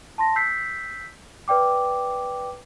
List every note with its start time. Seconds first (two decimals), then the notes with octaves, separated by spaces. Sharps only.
0.18 A5 C6 A#6
0.36 E6 G6 B6 C7
1.48 B4 D5 G5 D6